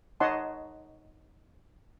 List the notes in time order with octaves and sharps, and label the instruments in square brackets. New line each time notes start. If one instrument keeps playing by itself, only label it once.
[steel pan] D#4 C#5 D#5 F#5 A5 C6